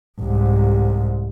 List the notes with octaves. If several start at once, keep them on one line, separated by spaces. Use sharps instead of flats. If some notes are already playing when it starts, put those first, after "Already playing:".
C2 G#2